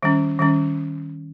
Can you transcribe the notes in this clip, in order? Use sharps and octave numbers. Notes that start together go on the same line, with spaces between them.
D#3 G3 C#4
D#3 G3 C#4